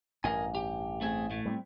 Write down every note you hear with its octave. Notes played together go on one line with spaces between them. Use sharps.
A1 G2 A#4 D#5 G#5
G4
A3 C4 G#4
A2 A3
G3 B3 C4